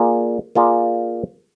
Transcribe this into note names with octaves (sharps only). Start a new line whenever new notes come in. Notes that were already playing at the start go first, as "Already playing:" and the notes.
Already playing: A#3 F4 G#4 D5
A#3 F4 G#4 D5